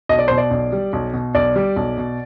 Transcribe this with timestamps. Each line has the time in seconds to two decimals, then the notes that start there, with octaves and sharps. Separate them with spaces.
0.09 B1 D#5
0.19 D5
0.28 B2 C5
0.38 D5
0.51 B1
0.72 G3
0.93 B1
1.14 B2
1.35 B1 D5
1.56 G3
1.76 B1
1.98 B2